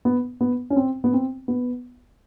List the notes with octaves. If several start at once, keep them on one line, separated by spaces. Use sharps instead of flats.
B3
B3
C#4
C4
B3
C4
B3